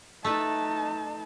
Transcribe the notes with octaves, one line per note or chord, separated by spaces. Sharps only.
A3 D#4 A4 B4 A5